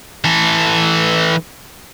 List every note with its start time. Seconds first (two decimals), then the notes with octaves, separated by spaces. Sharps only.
0.24 E3 A4